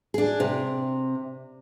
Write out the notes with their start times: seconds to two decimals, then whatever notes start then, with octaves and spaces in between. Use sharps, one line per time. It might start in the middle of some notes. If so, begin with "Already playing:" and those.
0.14 D4 G#4
0.40 C3